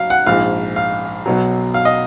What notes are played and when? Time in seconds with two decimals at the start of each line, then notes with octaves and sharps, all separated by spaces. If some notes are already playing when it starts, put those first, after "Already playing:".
Already playing: F#3 F5
0.10 F#5
0.26 A#1 G#2 F3 F5
0.76 F5
1.26 B1 B2 F#3
1.74 F5
1.85 D#5